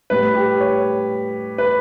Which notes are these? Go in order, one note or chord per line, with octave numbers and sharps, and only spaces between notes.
A2 G3 B4
G4
C#5
B4